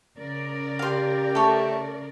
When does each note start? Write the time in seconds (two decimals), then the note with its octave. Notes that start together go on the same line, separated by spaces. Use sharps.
0.18 C#3 A#4 D5
0.79 G4 F5 C6
1.35 A3 A4 C#5